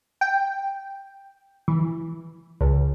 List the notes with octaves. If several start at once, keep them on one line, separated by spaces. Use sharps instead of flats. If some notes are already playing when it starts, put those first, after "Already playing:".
G5
E3
C#2